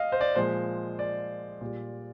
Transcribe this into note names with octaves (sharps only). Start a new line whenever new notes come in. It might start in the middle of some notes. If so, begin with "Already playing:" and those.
Already playing: D#5 F5
C5
D5
A#2 F3 G#3 C5
D5
A#2 G3